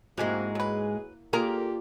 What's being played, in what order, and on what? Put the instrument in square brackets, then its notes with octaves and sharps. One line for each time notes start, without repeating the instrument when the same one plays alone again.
[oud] G#2 G#3 [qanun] A#3 E4 F#4 [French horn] C4 [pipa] G4 G#5
[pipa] F#3 B4 [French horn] G#4
[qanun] A#3 F4 D5 [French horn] G4 [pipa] G#4 A#5 [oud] A#4